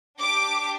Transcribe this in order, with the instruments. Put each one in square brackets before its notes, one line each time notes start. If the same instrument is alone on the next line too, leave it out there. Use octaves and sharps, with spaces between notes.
[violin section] D4 G4 D6